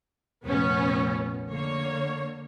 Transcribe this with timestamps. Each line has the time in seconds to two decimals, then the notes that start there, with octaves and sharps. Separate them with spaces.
0.44 F1 A#1 B3 C#4
1.50 D3 A#3 C#5